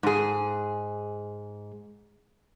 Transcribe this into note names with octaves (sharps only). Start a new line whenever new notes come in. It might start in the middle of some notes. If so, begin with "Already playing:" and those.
G#2 G#4